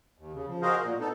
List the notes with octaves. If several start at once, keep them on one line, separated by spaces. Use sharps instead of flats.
D#2
C#3
F3
F#4 G#4 A#4 C5 D#5 F5
A#2
B3 D#4 A4